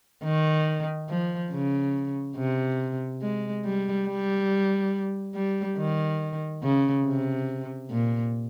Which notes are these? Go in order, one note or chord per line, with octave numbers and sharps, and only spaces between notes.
D#3
F3
C#3
C3
G#3
G3
G3
G3
D#3
C#3
C3
A#2